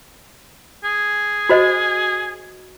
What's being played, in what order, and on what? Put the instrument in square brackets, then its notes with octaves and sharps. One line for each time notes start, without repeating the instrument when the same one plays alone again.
[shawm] G#4
[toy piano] F#4 C5 D#5